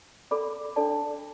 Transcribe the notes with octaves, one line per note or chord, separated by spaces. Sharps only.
A4 D5 B5 D6
D4 A4 D5 A5